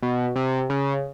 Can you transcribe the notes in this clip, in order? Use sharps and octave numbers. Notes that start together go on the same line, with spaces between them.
B2
C3
C#3